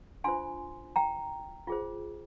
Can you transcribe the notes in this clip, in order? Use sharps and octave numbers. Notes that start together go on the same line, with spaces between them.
D4 F4 C5 G#5 C6
G5 A#5
F4 G#4 C5